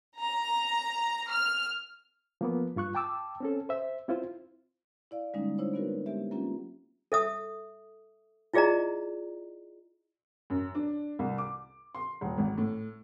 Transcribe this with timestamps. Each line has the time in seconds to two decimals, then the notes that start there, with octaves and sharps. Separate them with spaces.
0.20 A#5
1.30 F6
2.41 F3 A#3 B3
2.76 G2 F4 C#6 F#6
2.95 G5 A5 D6 E6
3.40 C4 C#4 A4
3.69 C5 E5
4.08 C4 E4 F4 C5
5.11 E4 D5 F5
5.34 D3 G3 G#3 A#3 C#4 D#4
5.58 D4 E4 C5 C#5
5.74 B3 C4 D#4 F#4 A#4 B4
6.06 G#3 B3 G4 E5
6.31 F#3 A#3 C4 C#4 F4 G4
7.12 A4 E5 D#6
8.54 E4 F4 G#4 D5 D#5 A#5
10.50 F#2
10.75 D4
11.19 C2
11.38 D6
11.95 C6
12.21 D#1
12.38 G#1
12.58 A2